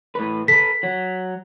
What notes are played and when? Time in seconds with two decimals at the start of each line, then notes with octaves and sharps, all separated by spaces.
0.15 A2 B4
0.48 A4 B4 B6
0.83 F#3